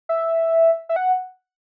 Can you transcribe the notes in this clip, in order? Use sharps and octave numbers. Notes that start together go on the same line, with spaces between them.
E5
E5
F#5